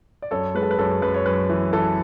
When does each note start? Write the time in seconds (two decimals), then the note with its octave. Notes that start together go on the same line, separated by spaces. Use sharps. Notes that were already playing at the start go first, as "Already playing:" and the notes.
0.22 D5
0.31 F#2 A4 C#5
0.55 G#3 B4
0.63 A4
0.71 B4
0.79 F#2 A4 C#5
1.02 F#2 B4
1.14 C#5
1.26 F#2 B4
1.49 E3
1.73 E3 A4